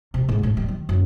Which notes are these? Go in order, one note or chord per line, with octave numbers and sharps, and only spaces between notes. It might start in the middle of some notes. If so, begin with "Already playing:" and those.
C3
G#2
A2
G3
D#3
F#2